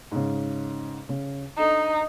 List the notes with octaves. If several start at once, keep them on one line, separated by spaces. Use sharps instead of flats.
G#2 C#3
C#3
D4 D#4 A4